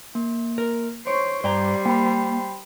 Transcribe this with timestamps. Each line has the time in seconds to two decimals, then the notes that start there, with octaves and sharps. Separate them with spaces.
0.15 A#3
0.58 A#4
1.07 C5 C#5 C#6 D7
1.44 G2 G3 C5 D5 G5 A#5
1.86 A#3 G5 B5